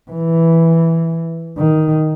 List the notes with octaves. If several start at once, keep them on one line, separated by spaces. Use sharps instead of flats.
E3
D#3